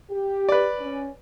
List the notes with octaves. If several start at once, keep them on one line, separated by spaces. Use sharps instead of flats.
G4
B4 D5
C#4